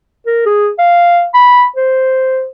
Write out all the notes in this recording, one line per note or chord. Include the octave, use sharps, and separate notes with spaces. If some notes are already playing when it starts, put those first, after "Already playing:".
A#4
G#4
F5
B5
C5